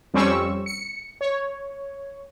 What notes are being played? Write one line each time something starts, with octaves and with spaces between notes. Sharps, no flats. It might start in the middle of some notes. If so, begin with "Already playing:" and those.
F2 G3 C4 C#4 C#6 E6
C#7
C#5